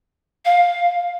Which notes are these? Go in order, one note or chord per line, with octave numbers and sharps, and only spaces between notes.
F5